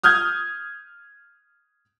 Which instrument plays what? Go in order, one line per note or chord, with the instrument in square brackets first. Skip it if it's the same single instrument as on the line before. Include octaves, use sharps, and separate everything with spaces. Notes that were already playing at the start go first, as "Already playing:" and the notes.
[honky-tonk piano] D#6 F6 G6 G#6